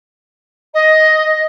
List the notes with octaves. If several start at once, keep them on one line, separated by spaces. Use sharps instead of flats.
D#5